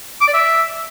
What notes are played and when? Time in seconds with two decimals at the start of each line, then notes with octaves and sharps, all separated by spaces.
0.21 D6
0.28 D5
0.34 E5